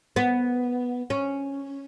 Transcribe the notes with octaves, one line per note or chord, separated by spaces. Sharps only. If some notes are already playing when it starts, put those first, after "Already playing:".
B3
C#4